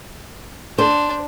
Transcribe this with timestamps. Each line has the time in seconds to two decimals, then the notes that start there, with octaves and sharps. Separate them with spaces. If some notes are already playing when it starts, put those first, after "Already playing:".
0.78 D4 C5